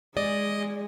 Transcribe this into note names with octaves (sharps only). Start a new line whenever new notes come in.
G#3 G#4 D5 D#5